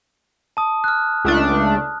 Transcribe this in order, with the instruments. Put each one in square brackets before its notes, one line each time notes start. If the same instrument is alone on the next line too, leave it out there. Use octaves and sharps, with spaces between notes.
[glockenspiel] A5 D#6
F6 F#6
[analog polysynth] C#2 A3 D4